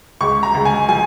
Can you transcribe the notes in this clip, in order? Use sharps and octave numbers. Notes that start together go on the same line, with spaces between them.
C#2 C#6
A#5
C#2
G#5
F3 G#5